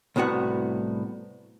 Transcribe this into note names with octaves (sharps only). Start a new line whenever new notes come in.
C2 A2 B3 F#4 F#5